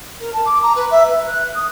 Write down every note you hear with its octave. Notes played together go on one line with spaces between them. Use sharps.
A#4
A5
D6
A#5
B4
E5
B4
F#6
D#6